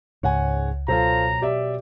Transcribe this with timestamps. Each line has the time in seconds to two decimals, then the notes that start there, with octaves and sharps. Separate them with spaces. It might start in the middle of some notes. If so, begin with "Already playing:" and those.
0.23 C#2 G#2 C#3 C#5 F#5 G#5
0.88 B2 F#3 F4 A4 C5 A#5
1.42 G4 D5 E5